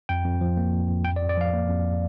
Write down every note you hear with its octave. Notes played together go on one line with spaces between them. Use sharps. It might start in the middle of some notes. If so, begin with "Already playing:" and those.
F2 G5
F2
F3
A#3
F2
F2
F2 G5
D5
F2
D5
F3 F5
A#3
F2